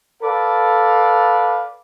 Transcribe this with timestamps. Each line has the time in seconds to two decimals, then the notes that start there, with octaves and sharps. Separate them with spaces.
0.21 A4 B4 D5 F5